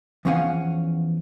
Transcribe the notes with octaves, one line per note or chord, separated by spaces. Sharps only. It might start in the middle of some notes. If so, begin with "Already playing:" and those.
E2 F3 C#4 F5 F#5 G#5